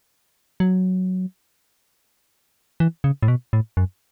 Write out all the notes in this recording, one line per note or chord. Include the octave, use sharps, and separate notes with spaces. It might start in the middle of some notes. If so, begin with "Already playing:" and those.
F#3
E3
C#3
A2
B2
A2
F#2